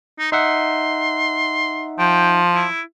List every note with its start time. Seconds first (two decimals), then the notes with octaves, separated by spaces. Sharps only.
0.19 D#4
0.32 D#4 E5 F#5 C6
1.99 F3 G5
2.55 E4